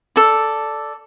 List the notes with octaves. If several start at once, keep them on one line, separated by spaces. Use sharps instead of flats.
A4 D5